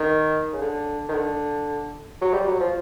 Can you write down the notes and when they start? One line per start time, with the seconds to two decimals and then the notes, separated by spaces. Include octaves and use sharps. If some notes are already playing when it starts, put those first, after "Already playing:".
Already playing: D#3
0.53 C#3
0.61 D3
1.09 D#3
1.14 D3
2.21 F#3
2.34 G3
2.47 F#3
2.60 F3